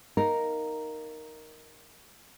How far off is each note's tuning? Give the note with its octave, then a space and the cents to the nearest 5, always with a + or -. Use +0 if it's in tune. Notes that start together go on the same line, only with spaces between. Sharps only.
D#4 +0 A#4 +0 F5 +0